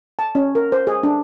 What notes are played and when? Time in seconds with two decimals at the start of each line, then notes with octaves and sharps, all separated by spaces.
0.19 A5
0.35 C#4
0.55 A#4
0.72 C5
0.87 G#4
1.03 D4